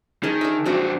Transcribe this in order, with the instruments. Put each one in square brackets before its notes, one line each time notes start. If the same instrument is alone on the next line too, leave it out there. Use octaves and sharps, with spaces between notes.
[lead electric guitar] D#3 [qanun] G#4 D#5 A5
[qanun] D4 E5
[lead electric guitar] F2 D4 [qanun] C4 F#4 D6